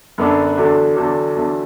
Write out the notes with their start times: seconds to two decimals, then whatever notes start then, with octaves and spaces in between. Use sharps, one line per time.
0.18 F#2 D3 B3 D4 A4
0.57 E2 D3 F#3 D4 A4
0.96 E2 D3 F#3 D4 A4
1.35 E2 D3 F#3 D4 A4